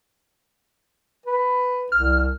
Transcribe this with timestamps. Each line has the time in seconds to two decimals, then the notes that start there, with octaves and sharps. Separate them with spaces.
1.26 B4
1.92 C2 F6